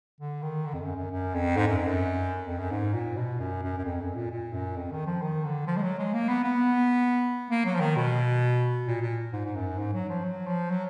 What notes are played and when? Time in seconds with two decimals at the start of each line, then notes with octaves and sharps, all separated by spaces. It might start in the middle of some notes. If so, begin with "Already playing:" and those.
0.20 D3
0.42 D#3
0.65 D3
0.74 F2
0.81 F#2
0.95 F#2
1.11 F#2
1.34 F2
1.56 G#2
1.67 F#2
1.77 F2
1.87 F#2
2.47 F2
2.58 F#2
2.71 G#2
2.93 A#2
3.16 B2
3.39 F#2
3.62 F#2
3.78 F#2
3.84 F2
4.00 F#2
4.15 A#2
4.31 A#2
4.53 F#2
4.76 F2
4.92 D#3
5.06 F3
5.22 D#3
5.44 D3
5.67 F3
5.77 G#3
5.83 F#3
5.99 G#3
6.13 A#3
6.28 B3
6.44 B3
7.50 A#3
7.65 F#3
7.75 F3
7.80 D#3
7.96 B2
8.87 A#2
9.02 A#2
9.33 G#2
9.44 G#2
9.56 F#2
9.78 G#2
9.93 F#3
10.09 F3
10.24 F#3
10.47 F3
10.70 F#3